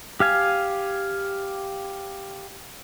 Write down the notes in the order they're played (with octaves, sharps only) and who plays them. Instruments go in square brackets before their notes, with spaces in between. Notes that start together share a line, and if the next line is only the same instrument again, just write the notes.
[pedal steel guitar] G4 F5 G#5